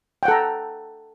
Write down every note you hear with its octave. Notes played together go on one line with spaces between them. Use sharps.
A4 F#5 G5 A#5